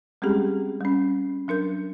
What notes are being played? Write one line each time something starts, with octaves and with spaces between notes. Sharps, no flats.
G3 G#3 C4 C#4 G4 G#4
G3 C#4
F#3 D4 A#4 G6